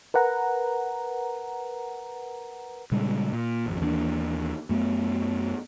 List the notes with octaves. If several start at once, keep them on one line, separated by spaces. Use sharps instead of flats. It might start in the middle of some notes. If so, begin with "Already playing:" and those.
A#4 B4 F#5 A#5
A#2 C#3 G3 G#3
A#2
G#1 F2
D#2 E3 A#3 D4
F#2 A3 B3